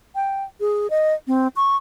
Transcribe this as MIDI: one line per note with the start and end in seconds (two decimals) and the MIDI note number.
0.15 0.44 79
0.60 0.90 68
0.90 1.14 75
1.27 1.48 60
1.56 1.76 85